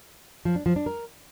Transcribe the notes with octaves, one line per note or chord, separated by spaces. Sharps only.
F3
D4
F3
D4
A#4